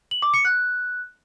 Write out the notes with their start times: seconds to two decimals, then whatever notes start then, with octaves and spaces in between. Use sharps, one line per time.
0.11 F#7
0.22 D6
0.34 C#7
0.45 F#6